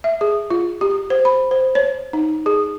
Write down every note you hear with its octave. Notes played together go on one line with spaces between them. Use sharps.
E5
G#4
F4
G4
C5
B5
C5
C#5
D#4
G#4